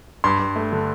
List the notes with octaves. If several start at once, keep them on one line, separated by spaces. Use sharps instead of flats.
G2 C6
G2
A3
D3